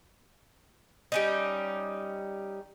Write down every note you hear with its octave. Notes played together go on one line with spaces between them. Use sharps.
G3 C#4 D#4